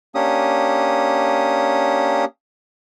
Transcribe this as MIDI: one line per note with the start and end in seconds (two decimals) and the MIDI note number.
0.15 2.25 58
0.15 2.25 61
0.15 2.25 62
0.15 2.25 67
0.15 2.25 87